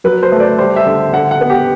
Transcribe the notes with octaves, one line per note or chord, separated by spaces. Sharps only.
F#3 B4
C5
A3
D5
G3 C5
E5
D3
D3 F#5
F#5
B3
G4